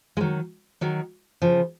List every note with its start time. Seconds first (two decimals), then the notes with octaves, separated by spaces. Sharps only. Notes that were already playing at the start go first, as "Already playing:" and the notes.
0.17 G#3
0.21 D#3 F#3
0.81 D#3 F#3
1.42 C#3 F3